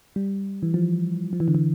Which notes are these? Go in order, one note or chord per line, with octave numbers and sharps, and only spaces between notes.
G3
E3
F3
F3
E3
D3
E3